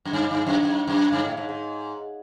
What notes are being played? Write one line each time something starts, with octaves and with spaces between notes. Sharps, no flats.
F#2
G2
G2
F#2
F#2
F#2
G2
A2
G#2
G#2